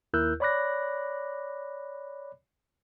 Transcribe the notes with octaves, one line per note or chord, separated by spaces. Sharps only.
D#2 E4 A#4 E6 F#6 G6
C#5 D5 B5 D6 F#6 A#6